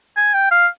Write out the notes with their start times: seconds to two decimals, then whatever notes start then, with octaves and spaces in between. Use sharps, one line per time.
0.17 G#5
0.34 G5
0.51 F5